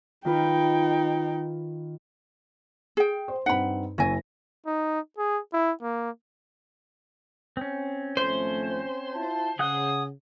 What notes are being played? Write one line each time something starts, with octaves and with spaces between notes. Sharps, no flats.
D#3 D#4 F4 B4 G5
G#4 G5
C5
G2 C4 D#4 F#5 B5
F#1 C#4 E4 G#5 A#6
D#4
G#4
E4
A#3
C4 C#4
G#1 F3 A3 C5
E4 F4 A5
C#3 G#4 F#5 D#6 F#6